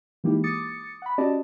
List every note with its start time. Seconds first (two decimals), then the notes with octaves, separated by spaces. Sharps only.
0.24 E3 G#3 A#3 D#4 E4 G4
0.44 D6 D#6 A6 C#7
1.02 F#5 B5
1.18 C#4 F#4 G4 D5 D#5 A5